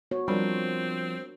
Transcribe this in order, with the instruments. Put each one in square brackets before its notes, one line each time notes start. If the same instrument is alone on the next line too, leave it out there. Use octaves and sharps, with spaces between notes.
[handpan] B3 F#4 C#5
[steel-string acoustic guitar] F3 [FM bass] G3 [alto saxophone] C4 [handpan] D4 A#4